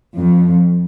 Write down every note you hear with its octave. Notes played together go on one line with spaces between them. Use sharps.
F2